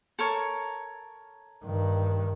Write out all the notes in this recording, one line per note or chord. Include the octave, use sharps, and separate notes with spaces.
A4 A#4 C#5
G2 D#3